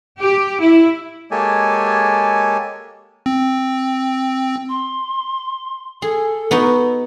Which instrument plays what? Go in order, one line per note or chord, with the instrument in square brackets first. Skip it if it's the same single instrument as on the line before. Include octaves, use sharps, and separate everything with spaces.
[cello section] G4
E4
[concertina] G#3 A#3 G4 A4 C#5 G#5
[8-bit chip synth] C4
[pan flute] C6
[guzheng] G#4 [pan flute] A4
[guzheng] B3 D#4 F#4